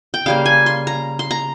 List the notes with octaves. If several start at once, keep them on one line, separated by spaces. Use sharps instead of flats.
G5
C#3 G3 A#3 F5
G#5
C6
A#5
C6
A#5